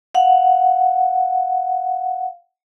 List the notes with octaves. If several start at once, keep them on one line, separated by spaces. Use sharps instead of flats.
F5 F#5